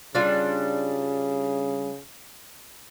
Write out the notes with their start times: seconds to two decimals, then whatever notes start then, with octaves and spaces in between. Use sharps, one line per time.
0.15 C#3 G3 D4 F4